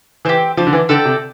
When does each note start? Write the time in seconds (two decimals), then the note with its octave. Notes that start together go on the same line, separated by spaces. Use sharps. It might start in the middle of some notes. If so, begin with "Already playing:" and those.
0.25 E3 C4 G4
0.57 F3 D4
0.67 D3
0.73 E3
0.89 D3 A4 D5 G5
1.05 C3